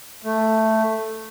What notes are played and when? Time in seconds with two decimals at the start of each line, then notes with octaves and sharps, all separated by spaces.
0.24 A3